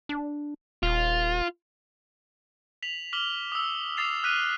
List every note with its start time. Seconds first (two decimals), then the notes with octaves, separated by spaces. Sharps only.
0.09 D4
0.83 D#1 F4
2.83 B6 F7 F#7
3.13 D6 F6 B6 F#7 G7
3.52 D#6 E6
3.97 D6 D#6 A6 C7 F7
4.24 F6 F#6 B6 D#7